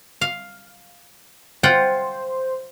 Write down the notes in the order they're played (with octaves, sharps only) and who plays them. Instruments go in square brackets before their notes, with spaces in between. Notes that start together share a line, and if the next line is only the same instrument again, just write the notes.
[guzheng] F5
[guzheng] F4 F#5 G5 [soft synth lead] C5